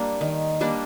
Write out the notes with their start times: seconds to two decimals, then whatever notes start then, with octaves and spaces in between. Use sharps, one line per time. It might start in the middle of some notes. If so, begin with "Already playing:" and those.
Already playing: G3 A#3 D4
0.21 D#3
0.61 G3 A#3 D4